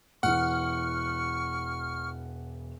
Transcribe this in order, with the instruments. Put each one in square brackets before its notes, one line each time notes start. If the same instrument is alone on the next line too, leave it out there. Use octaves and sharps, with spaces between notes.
[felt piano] E1 E3 [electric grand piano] F#5 [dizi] C#6 [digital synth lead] F6